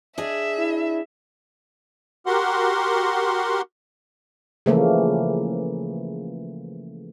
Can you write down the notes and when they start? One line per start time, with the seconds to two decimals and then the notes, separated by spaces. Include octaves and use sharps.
0.18 D4 G#4 D#5 E5
0.58 E4
2.26 F#4 G4 A#4 F#5 C6
4.66 C#3 E3 F3 A3 A#3